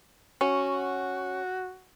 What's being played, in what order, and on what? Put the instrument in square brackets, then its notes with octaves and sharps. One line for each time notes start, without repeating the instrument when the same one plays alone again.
[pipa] C#4 [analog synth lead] F#4